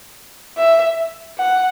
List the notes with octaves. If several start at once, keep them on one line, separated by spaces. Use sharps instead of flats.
E5
F#5